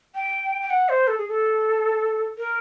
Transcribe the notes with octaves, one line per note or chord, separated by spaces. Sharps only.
G5
G5
F#5
C5
A4
G#4
A4
A#4